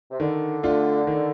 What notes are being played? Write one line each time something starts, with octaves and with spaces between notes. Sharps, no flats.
C3
D3 D#3
A3 D4 F4
D#3